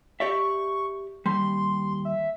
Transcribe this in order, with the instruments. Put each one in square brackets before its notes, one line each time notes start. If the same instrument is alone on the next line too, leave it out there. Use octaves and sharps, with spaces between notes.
[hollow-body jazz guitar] G4 D5 E5 [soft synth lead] C#6
[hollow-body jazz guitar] D#2 G3 [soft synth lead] C6
[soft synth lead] E5